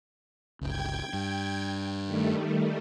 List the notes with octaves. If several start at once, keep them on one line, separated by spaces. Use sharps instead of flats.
G1 C#2 G5 G#6
G2
D#3 G3 A3